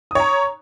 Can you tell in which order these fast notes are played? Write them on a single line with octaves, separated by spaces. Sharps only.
D#6 C#5 A#5